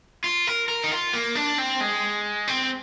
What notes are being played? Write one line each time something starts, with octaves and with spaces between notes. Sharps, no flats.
F4
A#4
A#4
D#4
F4
A#3
D4
C4
G#3
C4